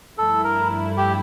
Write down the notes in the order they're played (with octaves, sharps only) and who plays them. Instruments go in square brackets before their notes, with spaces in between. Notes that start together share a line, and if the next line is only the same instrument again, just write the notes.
[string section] G2 F3 A3 E4 [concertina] A4
[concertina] A#4
G4